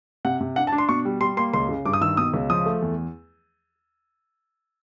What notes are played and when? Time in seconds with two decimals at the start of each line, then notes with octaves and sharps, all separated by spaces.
0.25 C3 F#5
0.40 C3
0.56 D4 F#5
0.67 A5
0.72 D4
0.78 C6
0.89 B2 C#6
1.05 G3
1.21 G3 C6
1.37 A#3 C6
1.54 C#2 C6
1.69 C#3
1.85 G2 D6
1.93 D#6
2.01 D#3 E6
2.17 B2 D#6
2.34 C#2
2.50 F3 D#6
2.66 A3
2.82 E2